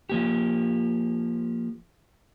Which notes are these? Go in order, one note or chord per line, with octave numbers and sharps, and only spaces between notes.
F3 A#3 G4